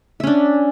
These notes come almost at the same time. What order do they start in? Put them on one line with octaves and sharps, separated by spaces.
E5 C#4 D4